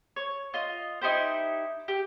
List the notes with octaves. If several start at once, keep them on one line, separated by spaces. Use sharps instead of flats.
C#5
F4 D#5
D#4 E4 G4 C5
G4